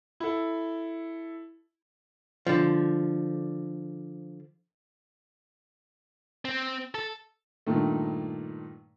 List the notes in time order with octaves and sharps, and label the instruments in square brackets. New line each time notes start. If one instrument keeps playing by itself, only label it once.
[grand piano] E4 A4
[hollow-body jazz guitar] D3 F3
[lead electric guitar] C4
A4
[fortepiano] G2 A#2 D#3 A3